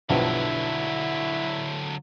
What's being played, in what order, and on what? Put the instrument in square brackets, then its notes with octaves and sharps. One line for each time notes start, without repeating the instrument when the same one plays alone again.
[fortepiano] B1 G2 F3 [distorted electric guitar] D3 F#3 [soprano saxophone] E4